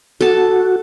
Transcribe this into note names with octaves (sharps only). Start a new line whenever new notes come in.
F#4 A4 A5